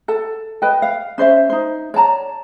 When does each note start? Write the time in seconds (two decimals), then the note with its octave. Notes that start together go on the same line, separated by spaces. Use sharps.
0.08 A4 A5
0.62 B4 D#5 G5
0.82 F5
1.18 C#4 C5 D5 E5
1.50 D#4 C5
1.94 C#5 D5 A5 A#5